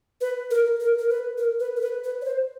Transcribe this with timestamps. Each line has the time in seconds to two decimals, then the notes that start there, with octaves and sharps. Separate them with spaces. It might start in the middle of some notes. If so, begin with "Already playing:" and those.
0.21 B4
0.51 A#4
0.80 A#4
0.98 A#4
1.09 B4
1.38 A#4
1.60 B4
1.76 A#4
1.81 B4
2.04 B4
2.22 C#5
2.25 C5